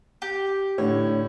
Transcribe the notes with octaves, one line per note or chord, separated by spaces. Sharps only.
G4
A2 D3 C#5